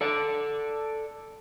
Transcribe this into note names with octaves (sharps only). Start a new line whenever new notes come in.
A4 D5